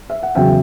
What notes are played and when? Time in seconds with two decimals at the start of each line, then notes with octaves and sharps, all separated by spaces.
0.10 E5
0.23 F#5
0.35 E2 C#3 F#3 E5 G5